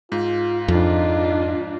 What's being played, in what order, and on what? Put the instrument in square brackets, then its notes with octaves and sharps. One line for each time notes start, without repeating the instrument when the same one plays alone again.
[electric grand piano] G#2 [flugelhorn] F4
[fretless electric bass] F2 [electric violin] D4 F4 [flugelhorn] D#4